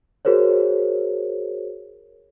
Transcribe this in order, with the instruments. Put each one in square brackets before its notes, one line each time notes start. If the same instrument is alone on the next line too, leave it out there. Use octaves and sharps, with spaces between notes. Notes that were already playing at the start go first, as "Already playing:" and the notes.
[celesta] F#4 G#4 A#4 C5 C#5